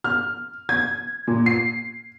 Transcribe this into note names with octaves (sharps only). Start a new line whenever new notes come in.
F6
G#6
A#2
C7